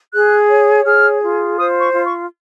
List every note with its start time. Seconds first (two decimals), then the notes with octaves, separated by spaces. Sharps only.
0.14 G#4 F#6
0.50 C#5
0.85 G#4 F6
1.22 F4
1.58 C5 D#6
1.82 C#6
1.94 F4
2.06 C#6